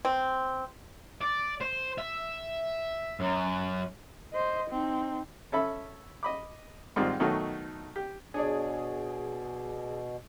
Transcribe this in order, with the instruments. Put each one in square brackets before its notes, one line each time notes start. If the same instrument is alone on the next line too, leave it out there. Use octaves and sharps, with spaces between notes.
[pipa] C4
[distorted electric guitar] D5
C5
E5
F#2
[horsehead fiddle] C5 D#5
C4 D#4
[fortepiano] C#4 A4 E5 B5
D#5 B5 D6
G#2 D#3 G3 C4 F4
B2 D#3 F#3 A3 D#4 F#4
G4
[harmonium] B2 [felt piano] D4 C#5 D5 [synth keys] G#4